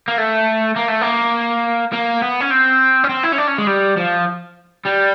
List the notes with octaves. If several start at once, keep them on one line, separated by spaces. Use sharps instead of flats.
A#3
A3
A#3
A3
A#3
A#3
B3
C#4
C4
C#4
C4
E4
C#4
D4
C#4
G#3
G3
F3
G3